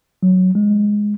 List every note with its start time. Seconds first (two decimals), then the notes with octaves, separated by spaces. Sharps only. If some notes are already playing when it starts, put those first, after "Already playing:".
0.23 F#3
0.55 G#3